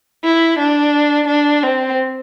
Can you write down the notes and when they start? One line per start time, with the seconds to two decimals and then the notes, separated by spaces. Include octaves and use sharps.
0.24 E4
0.59 D4
1.28 D4
1.63 C4